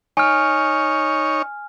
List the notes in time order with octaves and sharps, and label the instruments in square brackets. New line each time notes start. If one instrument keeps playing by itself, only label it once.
[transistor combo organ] D#4 C#5 [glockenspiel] G#5 F6